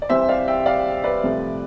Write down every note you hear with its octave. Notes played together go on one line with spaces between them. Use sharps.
D5
C2 C3 E3 G3 C5 E5
D5 F5
E5 G5
D5 F5
B4 D5
C2 C3 F3 A3